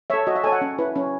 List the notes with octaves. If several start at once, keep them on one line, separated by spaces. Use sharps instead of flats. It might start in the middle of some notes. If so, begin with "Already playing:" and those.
A4 C#5 E5
F#4 D#5
E5
A4 C#5 G#5
F#5
C#4
E4 B4
C#4